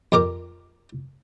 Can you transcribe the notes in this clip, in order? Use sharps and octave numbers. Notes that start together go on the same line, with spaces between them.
F2 G4 A#4 D6